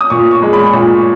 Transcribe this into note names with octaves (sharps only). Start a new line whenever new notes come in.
D#6
A#2 C#6
C#6
G#3
B5
A#2 C#6